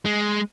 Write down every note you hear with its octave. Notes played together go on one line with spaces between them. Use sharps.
G#3